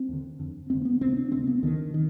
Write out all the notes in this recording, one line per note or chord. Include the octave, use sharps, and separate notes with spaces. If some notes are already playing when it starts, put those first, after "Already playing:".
Already playing: C4
D#2 D3
F2 D3
F2 D3 C4
B3
D2 C3 C4
D4
D2 C3 C4
B3
D2 D3 D#3
D#3